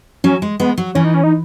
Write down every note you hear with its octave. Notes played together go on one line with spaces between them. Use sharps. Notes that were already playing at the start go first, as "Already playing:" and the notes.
F#3 C#4
G#3
G#3 B3
F#3
E3 C#4
D#4
C#4
D#4